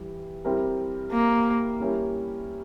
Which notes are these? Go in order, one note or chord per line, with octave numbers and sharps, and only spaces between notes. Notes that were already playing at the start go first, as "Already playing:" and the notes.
Already playing: E3 G3
G3 C4 E4 G4 A#4
A#3
G3 C#4 E4 G4 A#4